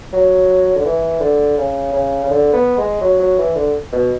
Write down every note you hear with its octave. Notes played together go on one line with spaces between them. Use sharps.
F#3
D3
E3
D3
C#3
C#3
C#3
D3
B3
G#3
F#3
F#3
E3
D3
B2